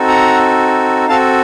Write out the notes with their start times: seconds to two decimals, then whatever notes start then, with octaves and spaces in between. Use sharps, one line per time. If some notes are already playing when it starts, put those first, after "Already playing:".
Already playing: C4 D#4 F#4 A4
0.08 F#5 A#5
1.08 C4 F#4 A4 F5 A5